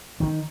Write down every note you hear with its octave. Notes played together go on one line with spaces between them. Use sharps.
D#3